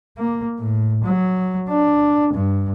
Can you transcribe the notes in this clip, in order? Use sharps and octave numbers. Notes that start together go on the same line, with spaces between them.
A#3
A2
F#3
D4
G2